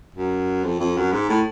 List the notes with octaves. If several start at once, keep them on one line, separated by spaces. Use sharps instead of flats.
F#2
F2
F2
F#2
G#2
A2